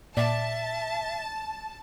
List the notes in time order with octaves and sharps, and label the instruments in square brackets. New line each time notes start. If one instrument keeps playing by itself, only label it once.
[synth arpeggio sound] A#2 [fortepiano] D5 [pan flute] E5 [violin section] A5